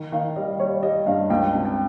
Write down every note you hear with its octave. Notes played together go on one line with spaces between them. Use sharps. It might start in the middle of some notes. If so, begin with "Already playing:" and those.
Already playing: D#3
D#3 F5
G3 D#5
G3 C#5
G3 D#5
G2 F5
C#2 G5
C3
G5